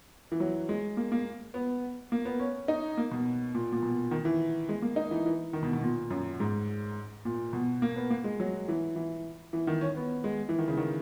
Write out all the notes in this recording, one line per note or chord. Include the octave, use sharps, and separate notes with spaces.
E3
F#3
G#3
A#3
A#3
B3
A#3
B3
C#4
D#4
A#3
B2
A#2
A#2
B2
D#3
E3
G#3
A#3
D#4
E3
E3
D#3
B2
B2
A#2
F#2
G#2
A#2
B2
A#3
B3
A#3
G#3
F#3
E3
E3
E3
D#3
C#4
B3
G#3
E3
D#3
C#3
D#3